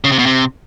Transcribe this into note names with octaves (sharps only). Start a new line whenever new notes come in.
C#3
C3
B2
C3